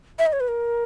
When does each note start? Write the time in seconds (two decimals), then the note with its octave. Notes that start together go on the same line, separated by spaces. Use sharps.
0.19 E5
0.26 D#5
0.33 C#5
0.40 B4
0.48 A#4